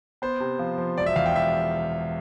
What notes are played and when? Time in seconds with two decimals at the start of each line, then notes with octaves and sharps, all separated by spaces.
0.22 B3 C5
0.40 C3
0.59 F3
0.78 F3
0.98 E1 D5
1.06 E5
1.16 E2 F5
1.26 G5
1.35 E1 E5